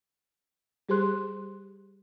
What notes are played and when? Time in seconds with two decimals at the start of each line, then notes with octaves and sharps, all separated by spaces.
0.89 G3 G4 G#4 C5 C6 F#6